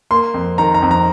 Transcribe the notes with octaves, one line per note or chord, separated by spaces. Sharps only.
A#3 C6
F2
D#3 A#5
A#5
F2
A#5